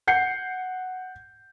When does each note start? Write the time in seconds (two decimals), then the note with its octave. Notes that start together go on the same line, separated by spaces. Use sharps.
0.07 F#5 G6 C7 C#7